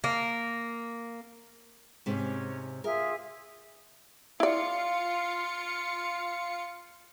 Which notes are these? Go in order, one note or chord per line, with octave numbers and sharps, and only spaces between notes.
A#3
G#2 C3 C#4
F4 G#4 A#4 E5
E4 F4 D5 F5 C#7